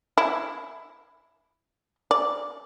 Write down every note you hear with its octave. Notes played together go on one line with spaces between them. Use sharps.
E4
D5